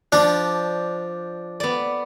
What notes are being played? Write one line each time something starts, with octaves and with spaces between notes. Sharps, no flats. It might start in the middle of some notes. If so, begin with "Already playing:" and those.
F3 D4
B3 D5